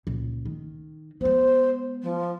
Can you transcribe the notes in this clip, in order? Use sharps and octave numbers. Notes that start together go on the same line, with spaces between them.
C#2 A#2
D#3
G#3 B3 C5
F3